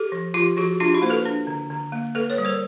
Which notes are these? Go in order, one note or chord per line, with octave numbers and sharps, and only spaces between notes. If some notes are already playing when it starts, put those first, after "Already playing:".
Already playing: G4 A4
F3
F3 F4 G4
F3 F#4 G#4
D4 F4 G4
E4 F#4
A#3 C5
A4 B4
D4
D3
D3
A#3
A#3 A4 B4
B4 C#5
G3
A#4 C5